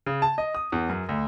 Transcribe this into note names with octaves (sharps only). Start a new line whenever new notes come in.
C#3
A5
D#5
D#6
E2
F#2
D2